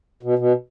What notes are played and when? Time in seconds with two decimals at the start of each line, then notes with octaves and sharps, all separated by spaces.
0.23 B2
0.38 B2